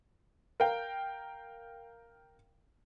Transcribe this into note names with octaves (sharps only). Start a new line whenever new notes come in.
A#4 F5 G5